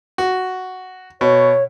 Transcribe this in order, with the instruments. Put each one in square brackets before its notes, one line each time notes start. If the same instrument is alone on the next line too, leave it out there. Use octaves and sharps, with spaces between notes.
[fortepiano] F#4
[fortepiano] B2 [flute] C#5